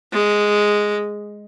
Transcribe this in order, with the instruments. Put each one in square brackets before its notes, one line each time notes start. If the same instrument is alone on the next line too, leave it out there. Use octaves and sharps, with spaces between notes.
[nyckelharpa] G#3